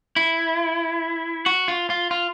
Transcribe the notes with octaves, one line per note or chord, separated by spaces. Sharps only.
E4
F#4
F4
F4
F4